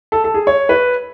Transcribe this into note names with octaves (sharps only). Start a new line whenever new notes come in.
A4
A4
G#4
C#5
B4